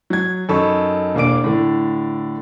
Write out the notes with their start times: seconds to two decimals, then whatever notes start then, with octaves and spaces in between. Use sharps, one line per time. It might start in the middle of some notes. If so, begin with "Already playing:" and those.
0.10 F#3 G#6
0.49 F#2 D#4 A4 B5 C#6
1.15 E1 A#3 D4 D6 D7
1.44 A2 D3